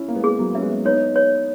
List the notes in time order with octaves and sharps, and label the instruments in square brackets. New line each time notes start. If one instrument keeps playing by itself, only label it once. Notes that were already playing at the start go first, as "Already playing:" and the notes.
Already playing: [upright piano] C#4 E4
A#3
G#3 B3
[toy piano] G#4
[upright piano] F#3 A#3
[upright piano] C#4 [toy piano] E5
[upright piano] G#3 B3
[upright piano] B3 D#4 [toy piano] C#5
[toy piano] C#5